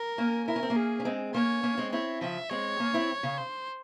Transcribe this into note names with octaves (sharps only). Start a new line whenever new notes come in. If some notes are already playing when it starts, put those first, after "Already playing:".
Already playing: A#4
A#3 C#4
E4 A#4
C#4
C4
A#3 C#4
G#4
C#4
G#3 C4
A#3 C#4 C#5
A#3 C#4
G#3 C4
C4 E4 C#5
C#3 F3 E5
G#3 C4 C#5
A#3 C#4
C4 E4
C#3
C5